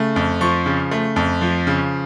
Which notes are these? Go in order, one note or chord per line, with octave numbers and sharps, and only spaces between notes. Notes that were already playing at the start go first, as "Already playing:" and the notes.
Already playing: C#3 A3
F2
F3 C#6
C#3
A3
F2
F3
C#3